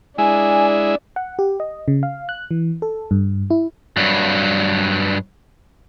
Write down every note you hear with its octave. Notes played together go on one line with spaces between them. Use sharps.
G#3 D4 E4 G#5
F#5
G4
D#5
C#3
F5
F#6
E3
A4
G2
E4
G2 F#3